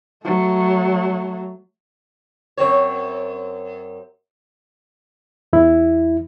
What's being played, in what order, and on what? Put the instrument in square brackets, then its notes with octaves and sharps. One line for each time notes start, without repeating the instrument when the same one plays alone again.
[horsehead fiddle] F#3 A3
[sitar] F#2 C4 C#5
[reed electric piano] E2 E4